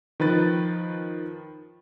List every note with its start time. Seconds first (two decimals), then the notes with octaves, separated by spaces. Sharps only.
0.20 D#3 F3 B4 A6